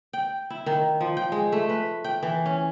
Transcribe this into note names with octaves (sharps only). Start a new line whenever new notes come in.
G5
E4
D#3
F3
G5
G#3
A3
B4
G5
E3
C#4